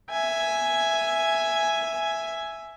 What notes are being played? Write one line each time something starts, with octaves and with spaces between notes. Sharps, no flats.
E5 G#5